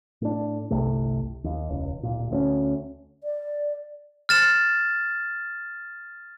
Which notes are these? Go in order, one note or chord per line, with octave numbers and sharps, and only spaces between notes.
A2 D4
G1 C2 C3 A3
D#2
E1 C#2
D1 G1 A#2
D2 C4 C#4
D5
F6 A6 E7